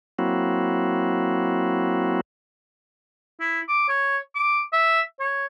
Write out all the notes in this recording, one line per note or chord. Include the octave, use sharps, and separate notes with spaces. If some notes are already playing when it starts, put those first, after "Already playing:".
F#3 A#3 C4 E4 F#4
E4
D6
C#5
D6
E5
C#5